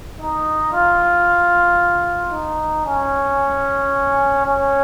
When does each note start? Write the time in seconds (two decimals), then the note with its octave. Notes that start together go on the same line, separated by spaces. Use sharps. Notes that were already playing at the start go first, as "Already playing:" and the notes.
0.19 D#4
0.72 F4
2.32 D#4
2.85 C#4
4.44 C#4